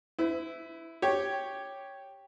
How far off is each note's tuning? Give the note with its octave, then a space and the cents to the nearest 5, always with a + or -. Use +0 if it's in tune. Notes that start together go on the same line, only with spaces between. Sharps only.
E4 +0 B4 +45
G4 +0 C#5 +0